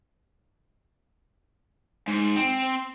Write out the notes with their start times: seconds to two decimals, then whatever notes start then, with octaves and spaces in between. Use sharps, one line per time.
2.08 G#2
2.36 C4